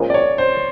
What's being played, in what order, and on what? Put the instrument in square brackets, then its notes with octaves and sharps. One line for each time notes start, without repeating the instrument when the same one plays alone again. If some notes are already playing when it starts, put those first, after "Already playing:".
Already playing: [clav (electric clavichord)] A#2 F3 G#3 C#4
[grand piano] D5
C#5
C5